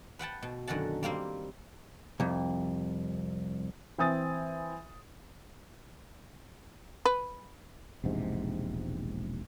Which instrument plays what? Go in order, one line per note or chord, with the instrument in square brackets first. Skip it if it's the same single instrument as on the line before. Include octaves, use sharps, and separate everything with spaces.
[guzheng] B4 F#5 G5 A5
B2
F#2 D3 D#3 F#5 A5
G3 A#3 C4 C5
[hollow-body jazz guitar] C2 F2
[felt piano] E3 C4 G#5 D#6 A6
[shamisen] B4
[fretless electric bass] E1 A#1 G#2 C3